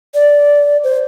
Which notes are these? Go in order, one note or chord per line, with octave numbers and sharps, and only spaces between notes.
D5
C5